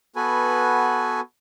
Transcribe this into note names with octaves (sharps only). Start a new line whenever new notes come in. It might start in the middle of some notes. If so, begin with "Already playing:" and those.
B3 F#4 A4 B4 G#5